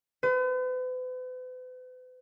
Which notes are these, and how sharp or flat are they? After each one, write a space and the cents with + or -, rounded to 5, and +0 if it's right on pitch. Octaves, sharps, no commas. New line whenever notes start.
B4 +45